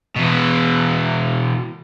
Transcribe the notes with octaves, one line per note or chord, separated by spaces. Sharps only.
B2 E3